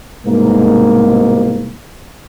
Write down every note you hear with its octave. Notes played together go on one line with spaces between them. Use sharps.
C2 G#2 B2 A#3